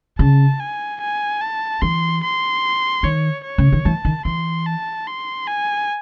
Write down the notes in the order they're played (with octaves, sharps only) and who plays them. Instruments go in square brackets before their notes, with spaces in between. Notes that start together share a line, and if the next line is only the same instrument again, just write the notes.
[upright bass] C#3 [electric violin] A5
[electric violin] G#5
G#5
A5
[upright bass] E3 [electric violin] C6
[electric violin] C6
[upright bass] D#3 [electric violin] C#5
[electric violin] C#5
[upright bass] C#3
D#3
[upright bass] E3 [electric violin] A5
[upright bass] D#3
[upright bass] E3 [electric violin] C6
[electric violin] A5
C6
G#5